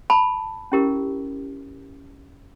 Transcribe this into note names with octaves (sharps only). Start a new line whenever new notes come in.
A5 B5
C#4 E4 G4 A#4